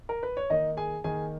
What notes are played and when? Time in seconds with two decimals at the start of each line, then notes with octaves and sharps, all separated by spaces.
0.09 A#4
0.23 B4
0.37 C#5
0.50 D#3 A#3 D#4 D#5
0.77 G#4 G#5
1.04 D#3 A#3 G#4 G#5